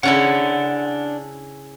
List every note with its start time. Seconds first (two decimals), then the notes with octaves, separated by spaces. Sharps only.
0.03 C#3 C#4 D4 E4 F#5